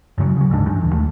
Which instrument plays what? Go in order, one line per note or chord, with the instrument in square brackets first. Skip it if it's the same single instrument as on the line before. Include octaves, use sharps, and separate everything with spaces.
[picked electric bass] F#2 C#3 E3 F#3
C#3 F#3
F#1 D2 G#2 D4
G2 E3
D#1 D#2
D#2 A3